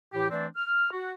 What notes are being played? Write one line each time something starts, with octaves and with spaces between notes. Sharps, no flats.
A2 E3 G4
E3 A3 C4 D4 D5
F6
F#4